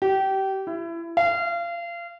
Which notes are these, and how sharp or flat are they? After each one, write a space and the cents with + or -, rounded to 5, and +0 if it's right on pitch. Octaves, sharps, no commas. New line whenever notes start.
G4 -25
E4 +25
F5 -30